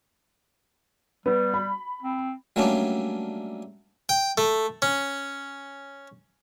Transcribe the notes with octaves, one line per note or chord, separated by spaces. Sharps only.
G3 B3
B5
C4
F#3 G3 A3 A#3 C#4 D4
G5
A3
C#4